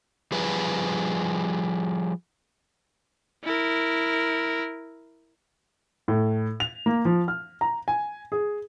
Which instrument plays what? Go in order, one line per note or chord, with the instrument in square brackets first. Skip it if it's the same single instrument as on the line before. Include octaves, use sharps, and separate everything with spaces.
[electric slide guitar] F3 G3 G#4 B4
[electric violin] E4 A#4
[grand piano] A2
F7
A#3
F3
F6
A#5
G#5
G#4